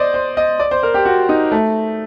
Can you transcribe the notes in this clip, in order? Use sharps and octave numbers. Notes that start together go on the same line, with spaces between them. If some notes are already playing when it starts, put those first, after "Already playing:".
Already playing: C5 D5 D#5
C5
D#5
D5
C5
A#4
G4
F#4
D#4
A3